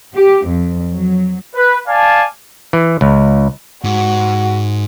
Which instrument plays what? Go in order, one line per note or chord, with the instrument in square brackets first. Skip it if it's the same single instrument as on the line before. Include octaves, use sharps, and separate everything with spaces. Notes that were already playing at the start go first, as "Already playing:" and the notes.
[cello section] G4
F2
F#3
[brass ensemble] B4
D5 F5 G#5 A5
[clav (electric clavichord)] E3
C#2
[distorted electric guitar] G#2 [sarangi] F#4